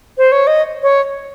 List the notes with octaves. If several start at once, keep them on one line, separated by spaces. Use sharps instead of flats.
C5
C#5
D#5
C#5